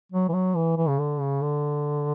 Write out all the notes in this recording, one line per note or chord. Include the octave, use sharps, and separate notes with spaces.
F#3
E3
F#3
E3
E3
C#3
D3
C#3
D3